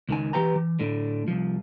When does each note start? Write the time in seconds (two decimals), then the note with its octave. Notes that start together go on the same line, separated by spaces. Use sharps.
0.09 C#2 D#3 G#5
0.33 E3 G4 B4 G5 A#5
0.56 E3
0.79 A2 D3
1.28 C2 F3